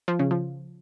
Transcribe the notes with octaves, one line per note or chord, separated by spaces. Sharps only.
F3
C#3
F3